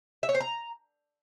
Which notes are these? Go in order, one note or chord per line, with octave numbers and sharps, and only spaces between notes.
E5
C#5
C5
A#5